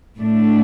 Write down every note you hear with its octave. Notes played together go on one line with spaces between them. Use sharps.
A2 A3 D4